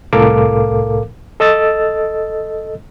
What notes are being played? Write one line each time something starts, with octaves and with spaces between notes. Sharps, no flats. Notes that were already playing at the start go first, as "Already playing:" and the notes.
C2 A2 A4 A#4 F5 D6
A4 D#5 E6 A6